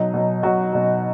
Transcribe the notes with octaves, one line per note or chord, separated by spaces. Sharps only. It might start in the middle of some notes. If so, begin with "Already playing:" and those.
Already playing: B2 F#3 D#4
B2 F#3
B2 F#3 F#4
B2 F#3